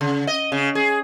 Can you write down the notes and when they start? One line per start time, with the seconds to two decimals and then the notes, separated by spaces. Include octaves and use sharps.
0.01 C#3
0.27 D#5
0.52 C#3
0.75 G#4